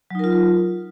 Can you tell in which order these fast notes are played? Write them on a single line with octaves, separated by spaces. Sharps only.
F#3 D#4 A#4 F4